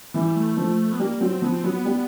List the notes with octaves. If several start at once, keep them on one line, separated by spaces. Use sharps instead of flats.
E3 G3
A3
F3
B3
G3 A#3
F#3 C4
F3 B3
C4
F#3 B3
B3
G3